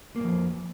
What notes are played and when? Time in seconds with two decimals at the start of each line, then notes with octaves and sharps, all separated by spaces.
0.16 A#3
0.20 G#2
0.24 F2